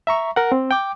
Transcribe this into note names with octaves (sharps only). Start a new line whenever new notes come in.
E5 A#5 C#6
A#4 F#5
C4
G5 D6